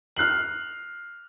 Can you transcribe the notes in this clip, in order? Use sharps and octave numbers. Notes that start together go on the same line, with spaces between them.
F6 F#6 C7 F#7